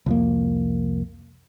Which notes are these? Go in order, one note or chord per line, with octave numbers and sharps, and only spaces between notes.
C2 F2 A#3